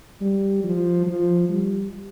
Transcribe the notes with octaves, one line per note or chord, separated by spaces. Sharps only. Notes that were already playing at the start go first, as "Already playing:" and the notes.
G3
F3
F3
G3